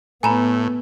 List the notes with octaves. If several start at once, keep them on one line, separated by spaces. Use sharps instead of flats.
A2 B3 G#5 A#5 B5